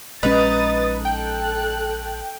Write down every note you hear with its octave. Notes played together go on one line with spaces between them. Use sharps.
A#1 G#3 C#4 D#4 B4 D#6 A6
A4 G5 F#6